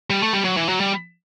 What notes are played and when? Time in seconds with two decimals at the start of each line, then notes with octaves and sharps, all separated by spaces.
0.10 G3
0.22 A3
0.33 G3
0.45 F#3
0.57 E3
0.69 F#3
0.80 G3